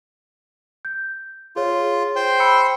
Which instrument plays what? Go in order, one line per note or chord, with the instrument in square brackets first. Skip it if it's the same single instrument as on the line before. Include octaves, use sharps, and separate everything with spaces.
[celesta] G6
[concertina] F4 [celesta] G#4 C#5
[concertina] C5 G5
[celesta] B5 E6 C#7